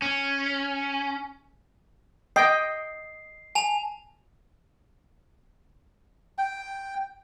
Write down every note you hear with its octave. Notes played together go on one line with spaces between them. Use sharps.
C#4
D#5 G5 C7
G#5 A5 F7
G5